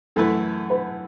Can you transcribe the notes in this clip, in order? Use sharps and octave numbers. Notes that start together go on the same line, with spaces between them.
F#2 E3 A3 E4 A4 B4
B4